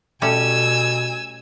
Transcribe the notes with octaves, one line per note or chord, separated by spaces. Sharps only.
B2 G3 A3 C#4 G#5 E6